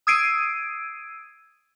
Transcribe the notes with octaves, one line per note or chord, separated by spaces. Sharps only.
D#6 E6 G#6 C7 D7 D#7